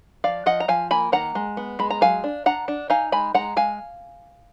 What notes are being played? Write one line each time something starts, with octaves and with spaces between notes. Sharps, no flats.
F3 D5 F5
F3 D#5 F#5
A#5
F3 F5 G#5
A#3 G#5 B5
D#3 F#5 A#5
G#3
B3
G#3 B5
A#5
F#3 F5 G#5
D4
D4 F#5 A#5
D4
D#4 F5 G#5
G#3 G#5 B5
G#3 F#5 A#5
G#3 F5 G#5